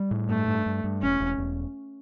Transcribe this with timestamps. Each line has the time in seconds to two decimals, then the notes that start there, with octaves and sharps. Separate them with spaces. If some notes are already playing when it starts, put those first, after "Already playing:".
Already playing: G3
0.11 A2
0.29 G2 A3
0.48 G2
0.66 G2
0.84 G2
1.02 E1 C#4
1.20 E1
1.38 E1